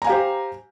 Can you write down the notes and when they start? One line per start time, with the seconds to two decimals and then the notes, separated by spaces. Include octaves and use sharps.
0.02 A#5
0.04 G#5
0.07 F5
0.09 G4
0.12 C5